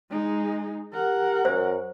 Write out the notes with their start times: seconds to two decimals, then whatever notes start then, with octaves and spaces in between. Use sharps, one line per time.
0.10 G#3 D#4
0.93 G4 A#4 F#5
1.45 F#2 C5